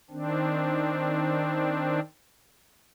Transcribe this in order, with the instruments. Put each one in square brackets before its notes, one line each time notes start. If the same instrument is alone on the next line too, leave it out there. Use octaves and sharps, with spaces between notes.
[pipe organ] D#3 C4 D4